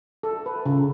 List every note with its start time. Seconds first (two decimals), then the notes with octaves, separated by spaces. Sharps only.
0.23 A4
0.46 B4
0.66 C#3